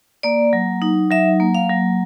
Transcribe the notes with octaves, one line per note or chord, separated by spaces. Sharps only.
A#3 D5
F#3
D#4
F#3 E5
A#3
F5
F#3